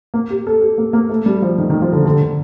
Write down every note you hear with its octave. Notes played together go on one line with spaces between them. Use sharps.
A#3
G4
A4
G4
A#3
A#3
A3
G3
F3
D#3
D#3
F3
D3
D3
D3